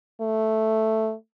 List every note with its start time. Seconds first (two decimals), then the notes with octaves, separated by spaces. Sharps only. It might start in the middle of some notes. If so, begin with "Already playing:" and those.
0.21 A3